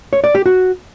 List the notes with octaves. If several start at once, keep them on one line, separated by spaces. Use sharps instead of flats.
C#5
D5
G4
F#4